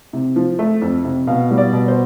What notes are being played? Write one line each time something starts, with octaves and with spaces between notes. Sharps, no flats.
C3
F3
A3
F2
C3
B2 F5
G3
D5
B2
C5